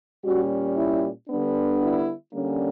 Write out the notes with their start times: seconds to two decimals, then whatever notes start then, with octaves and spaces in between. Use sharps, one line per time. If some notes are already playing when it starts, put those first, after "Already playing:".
0.24 A#2 G3 C#4 F#4
0.77 E4
1.29 D3 G3 B3 D4
1.80 E4
2.33 D3 G3 A#3 C#4